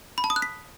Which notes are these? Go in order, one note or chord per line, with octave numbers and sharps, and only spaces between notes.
B5
A5
D#6
F#6
B6